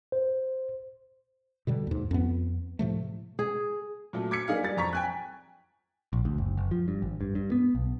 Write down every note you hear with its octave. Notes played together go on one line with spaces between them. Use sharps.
C5
B2 D3 G3
D#2 G#2
F2 B3
A2 C3 F3 A3
G#4
A#2 F#3 A3
D6 G#6 B6 C#7
A#3 D#4 G#4 D5 F5
G3 D5 A6
F2 A#5 C#6 B6
G5 G#5 F#6
A#1
D2
F#1
F#1
F3
G2
G#1
G2
G2
B3
B1